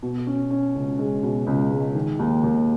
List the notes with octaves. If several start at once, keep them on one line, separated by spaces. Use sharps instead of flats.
B2
C#4
C#4
C#2
G#3
B2
C#2
G#3
D#3
D#2
D#2